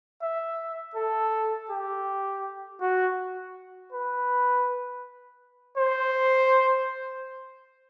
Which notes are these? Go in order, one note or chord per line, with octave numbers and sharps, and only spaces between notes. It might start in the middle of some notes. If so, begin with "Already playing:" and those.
E5
A4
G4
F#4
B4
C5